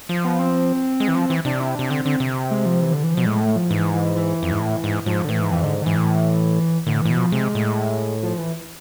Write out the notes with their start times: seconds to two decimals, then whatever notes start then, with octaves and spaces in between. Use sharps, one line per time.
0.09 F3
0.24 B3
0.39 C4
1.00 G#3
1.08 E3
1.15 F3
1.30 E3
1.45 C3 D4
1.60 E4
1.75 C3 D4
1.90 D3 C4
2.05 D3 C4
2.20 C3
2.51 G#3
2.65 F3
2.81 E3
2.92 D3
3.03 E3
3.14 B2 F3
3.26 A2 G#3
3.41 A3
3.56 F3
3.71 G#2 E3
3.94 E3
4.16 E3
4.43 F2
4.51 G#2
4.61 A2
4.84 G#2
5.06 G#2 F3
5.25 D3
5.28 A2 E3
5.41 G#2
5.51 F2 E3
5.63 G#2 D3
5.82 D3
5.86 G#2 E3
5.96 A2
6.87 A2 D3
7.02 A2 E3
7.10 B2
7.17 F3
7.32 C3 G#3
7.55 A2
8.23 F3
8.38 E3